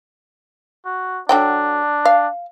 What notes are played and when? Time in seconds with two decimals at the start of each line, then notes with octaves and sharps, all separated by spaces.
0.85 F#4
1.29 D3 F#3 D4 G5
2.05 F5